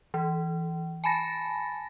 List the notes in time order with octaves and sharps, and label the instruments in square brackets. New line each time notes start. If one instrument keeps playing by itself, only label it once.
[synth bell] E3
G#5 A5 B5 A6 A#6